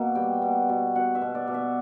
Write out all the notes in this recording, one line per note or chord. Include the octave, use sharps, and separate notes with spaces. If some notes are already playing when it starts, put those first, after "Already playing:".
Already playing: B2 A#3 E5
G3 G5
B2
B2
B2 F#5
E5
B2
D5
B2
E5